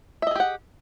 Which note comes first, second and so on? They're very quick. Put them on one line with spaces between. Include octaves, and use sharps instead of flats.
E5 D#5 G#4 G4 F#5